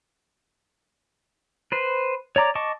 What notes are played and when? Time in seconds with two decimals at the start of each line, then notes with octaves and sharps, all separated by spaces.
1.72 B4 C5
2.36 C#5 D5 A#5 D6
2.55 D#5 A5 C#6 D6